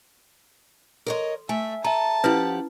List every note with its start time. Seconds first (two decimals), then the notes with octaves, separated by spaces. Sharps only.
1.07 A4 A#4 C#5 D#5 C6
1.49 A3 E5 G#5
1.84 A4 E5 A5 A#5
2.24 F3 C#4 E4 G4 B4 F#5